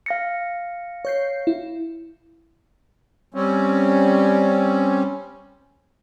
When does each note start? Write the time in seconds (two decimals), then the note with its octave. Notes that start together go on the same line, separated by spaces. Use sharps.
0.06 F5 A#6 C#7
1.05 C#5 G6 C7
1.47 E4
3.34 G3 C4 C#4